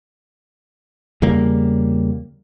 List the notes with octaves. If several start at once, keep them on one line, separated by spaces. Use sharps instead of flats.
E2 C#3 G3 A#3